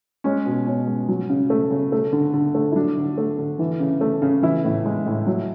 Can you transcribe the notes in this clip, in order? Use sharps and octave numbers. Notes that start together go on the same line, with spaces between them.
G#3 C#4
B2
B2 C#4
G#3
F#3
C#3
A3
C#3
A3
D3
D3
A3
E4
F#3 D4
D3
A3
D3
E3
C#3
A3
C#3
E3 E4
A2
G#3
A2
F#3